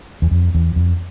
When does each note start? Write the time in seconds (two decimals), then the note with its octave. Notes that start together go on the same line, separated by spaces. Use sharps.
0.22 E2
0.31 F2
0.55 E2
0.76 F2